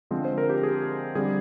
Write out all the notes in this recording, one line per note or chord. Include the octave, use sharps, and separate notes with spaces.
D3 F3 G#3 C4
C5
A#4
G4
G#4
D3 G3 C4 G#4